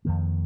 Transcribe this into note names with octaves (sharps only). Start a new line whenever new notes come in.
F2 D#3 A#3